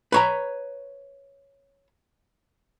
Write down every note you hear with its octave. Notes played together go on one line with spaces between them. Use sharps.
B4 C#5 A#5